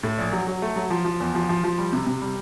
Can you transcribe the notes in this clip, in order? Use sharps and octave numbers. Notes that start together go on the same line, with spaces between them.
A2
A#1
F#3
F#3
A3
F#3
F3
F3
E2
F3
F3
F3
G3
C3
C3
G3